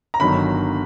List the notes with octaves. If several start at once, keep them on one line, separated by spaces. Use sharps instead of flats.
A#5
G1 G2 D#3 F#3 B5